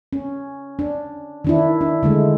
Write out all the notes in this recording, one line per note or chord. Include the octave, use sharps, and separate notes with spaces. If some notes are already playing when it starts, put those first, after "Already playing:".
C#4
D4
D#3 D4 E4
D4
D3 G#3 A3